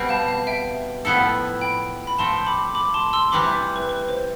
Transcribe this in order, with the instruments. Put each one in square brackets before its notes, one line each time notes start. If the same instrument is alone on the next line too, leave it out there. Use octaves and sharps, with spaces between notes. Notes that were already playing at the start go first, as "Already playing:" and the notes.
Already playing: [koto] B2 G3 C4
[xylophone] F5 A5
F5
E5 G5
[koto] A2 F3 B3 E4 A4
[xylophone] G5 B5
B5
[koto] F3 A3 C4 [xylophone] A5 C6
[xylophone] B5 D6
B5 D6
A5 C6
C6 E6
[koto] C3 E3 G3 [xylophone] B5 D6
[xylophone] E5
B4
B4
C5